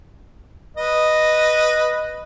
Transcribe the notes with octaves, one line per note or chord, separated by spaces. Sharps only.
B4 D#5